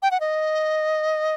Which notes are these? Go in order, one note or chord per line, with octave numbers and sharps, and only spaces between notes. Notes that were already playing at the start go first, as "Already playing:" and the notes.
G5
F#5
D#5